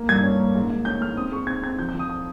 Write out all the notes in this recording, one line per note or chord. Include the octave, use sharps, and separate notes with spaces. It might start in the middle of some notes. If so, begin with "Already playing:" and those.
Already playing: A#3
G2 G#6
C#4
A#3
G#2
G#2
C#4 G6
G#2 F6
C4 D#6
G#3 C#6
C4 G#6
C4 G#6
F3 G6
G6
F3
D#6
D#6